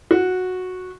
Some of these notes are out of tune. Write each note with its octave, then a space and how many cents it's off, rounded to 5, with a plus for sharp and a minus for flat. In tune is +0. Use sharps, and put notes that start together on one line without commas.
F#4 -10